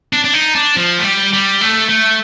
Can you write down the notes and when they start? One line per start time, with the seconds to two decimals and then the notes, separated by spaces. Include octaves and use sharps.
0.13 D4
0.24 D4
0.34 D#4
0.55 D4
0.76 F3
0.99 A3
1.04 G3
1.33 G3
1.61 A3
1.89 A3